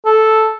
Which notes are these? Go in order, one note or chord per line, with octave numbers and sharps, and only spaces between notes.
A4